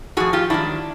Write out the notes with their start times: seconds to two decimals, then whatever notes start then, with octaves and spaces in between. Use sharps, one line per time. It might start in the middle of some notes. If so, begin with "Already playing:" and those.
0.17 A2 F3 F#4 G#4
0.33 F4 G4
0.50 G#2 D#3 F#3 D4 E4